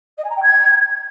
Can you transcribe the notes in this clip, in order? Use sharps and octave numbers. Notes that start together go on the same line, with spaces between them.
D#5
G#5
A#5
G5
G#6